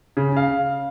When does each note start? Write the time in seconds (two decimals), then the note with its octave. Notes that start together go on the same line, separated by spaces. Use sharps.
0.17 C#3
0.37 F5